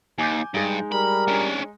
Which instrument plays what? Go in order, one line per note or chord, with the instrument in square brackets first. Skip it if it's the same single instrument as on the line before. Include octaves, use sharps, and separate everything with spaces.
[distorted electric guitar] D#2 [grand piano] G#5 D6 G6
[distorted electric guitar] G2 [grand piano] G#3 D#4
[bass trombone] G3 [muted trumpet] A#4 [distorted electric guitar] B5
[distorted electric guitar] C#4 D4